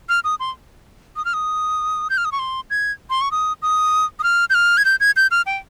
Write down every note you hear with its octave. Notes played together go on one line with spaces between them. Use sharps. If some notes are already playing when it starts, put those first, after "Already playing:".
F6
D#6
C6
D#6
F6
D#6
G6
F6
D#6
C#6
C6
G#6
C6
C#6
D#6
D#6
D#6
F6
G6
F6
G#6
G6
G#6
G6
F6
G5